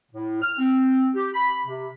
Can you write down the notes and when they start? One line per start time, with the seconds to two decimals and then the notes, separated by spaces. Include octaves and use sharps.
0.12 A2
0.42 F6
0.58 C4
1.15 G4
1.33 B5
1.66 C3